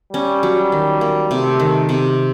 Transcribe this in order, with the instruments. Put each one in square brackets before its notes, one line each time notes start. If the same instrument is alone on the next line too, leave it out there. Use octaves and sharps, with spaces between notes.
[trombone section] G3 [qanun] C#4
[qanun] F#3
D#3
A#3
[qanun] C3 [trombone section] A3
[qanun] D#3
C3